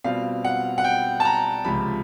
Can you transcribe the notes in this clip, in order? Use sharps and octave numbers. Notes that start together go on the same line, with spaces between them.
B2 G3 C4 F4 F5
F#5
F#5
G5
A5
A#5
C#2 C3 F3 B5